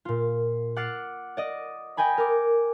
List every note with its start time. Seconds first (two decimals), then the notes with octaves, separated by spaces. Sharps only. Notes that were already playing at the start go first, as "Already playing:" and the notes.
0.05 A#2 F4
0.76 F#5 D6 F6 A6 C7
1.37 D5 D#5
1.97 D#5 G5 G#5 B5
2.18 A#4 D6